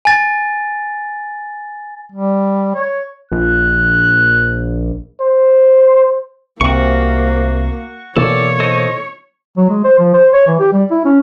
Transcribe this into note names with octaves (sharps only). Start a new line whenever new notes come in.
G#5 A6
G3
C#5
A#1 F#6
C5
C2 C3 A#3 F#4 C#6
B2 E3 A#3 A4 C#5 D5
A4 C5 D#5
F#3
G#3
C5
F3
C5
C#5
E3
G4
G3
E4
C#4